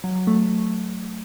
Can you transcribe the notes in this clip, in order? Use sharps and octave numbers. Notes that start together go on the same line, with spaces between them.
F#3
F#3
A3